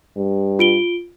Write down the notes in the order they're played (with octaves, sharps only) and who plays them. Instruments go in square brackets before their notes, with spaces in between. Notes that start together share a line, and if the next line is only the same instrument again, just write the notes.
[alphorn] G2
[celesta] F4 D7 G7